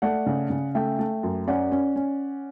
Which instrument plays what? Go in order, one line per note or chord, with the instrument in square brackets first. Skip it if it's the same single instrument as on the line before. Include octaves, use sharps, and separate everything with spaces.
[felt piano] A3 [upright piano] D5 F#5
[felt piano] C#3
C#3
[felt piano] A3 [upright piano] E5 G5
[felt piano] A3
F#2
[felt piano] C#4 [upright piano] D5 F#5
[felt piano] C#4
C#4